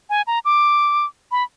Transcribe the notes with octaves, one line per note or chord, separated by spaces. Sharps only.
G#5
A#5
D6
B5